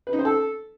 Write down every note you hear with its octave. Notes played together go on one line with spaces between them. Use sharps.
B4
D#4
C5
A4